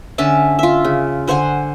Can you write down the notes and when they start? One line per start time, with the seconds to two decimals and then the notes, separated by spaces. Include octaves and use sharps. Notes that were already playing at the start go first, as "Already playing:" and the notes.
0.18 D3 C#4 E5 A5
0.59 F4 E5
0.85 C#3
1.28 D3 C5 F#5 G#5